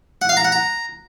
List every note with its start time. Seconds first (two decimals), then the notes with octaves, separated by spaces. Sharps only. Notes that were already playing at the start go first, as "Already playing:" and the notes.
0.22 F#5
0.29 F5
0.37 A#5
0.45 F#5
0.52 A#5